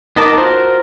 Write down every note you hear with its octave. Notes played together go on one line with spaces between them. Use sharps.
B3 D#4 A#4 D#5 A5 D6
F4 F#4 A#4 C5